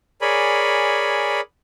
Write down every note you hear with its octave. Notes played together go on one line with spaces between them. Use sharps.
G#4 A#4 C#5 D5 G#5 B5